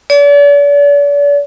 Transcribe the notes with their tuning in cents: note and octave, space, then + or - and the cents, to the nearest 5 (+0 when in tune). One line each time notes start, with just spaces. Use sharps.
D5 -40